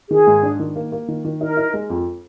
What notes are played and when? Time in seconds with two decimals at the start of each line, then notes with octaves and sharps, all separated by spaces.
0.10 D#3 G#4
0.27 G#2
0.43 D4
0.60 D#3
0.76 A#3
0.92 A#3
1.08 D#3
1.25 D#3
1.41 D#4 A#4
1.57 D#4
1.74 G#3
1.90 F2